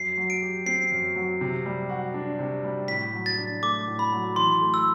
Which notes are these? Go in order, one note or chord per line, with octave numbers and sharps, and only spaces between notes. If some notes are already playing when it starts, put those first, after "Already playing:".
Already playing: F#2 C7
F#3
D7
G4
C4 C7
F#2
F#3
C3
G3
F#4
D4
C3
G3
A2 B6
F#3
A6
D4
A3 D6
A2
B5
F#3
E3 C6
A3
E6